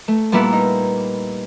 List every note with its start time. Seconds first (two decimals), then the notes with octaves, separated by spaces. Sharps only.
0.08 A3
0.32 A#2 G3 A#3 B3 E4
0.52 D#4